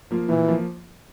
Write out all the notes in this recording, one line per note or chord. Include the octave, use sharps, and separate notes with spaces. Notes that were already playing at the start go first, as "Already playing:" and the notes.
F3 A#3 F4
A#2 E3
F3 A#3 F4